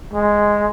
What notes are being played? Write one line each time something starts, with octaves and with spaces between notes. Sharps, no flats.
G#3